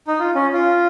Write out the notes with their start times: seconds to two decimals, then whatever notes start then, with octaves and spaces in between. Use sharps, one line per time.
0.07 D#4
0.19 F4
0.35 C#4
0.53 F4